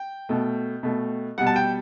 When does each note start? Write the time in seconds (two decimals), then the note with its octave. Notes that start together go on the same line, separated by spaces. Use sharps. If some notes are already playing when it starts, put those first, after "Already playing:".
Already playing: G5
0.29 B2 A3
0.83 B2 A3
1.38 B2 G3 F#5
1.47 A5
1.56 G5